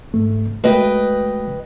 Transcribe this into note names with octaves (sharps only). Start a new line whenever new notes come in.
G#2 A3
G#3 A3 F#4 B4 D#5 G5